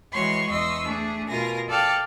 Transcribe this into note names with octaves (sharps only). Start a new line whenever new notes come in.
E3 G#3 F#4 C#5 C6 C#6
E2 D#5 C6 C#6 E6
A3 D4 G#4
B2 F4 A#4 G#5 A#6
A4 D5 F5 G5 A5